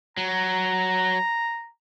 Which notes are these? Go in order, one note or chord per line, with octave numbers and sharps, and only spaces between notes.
F#3 A#5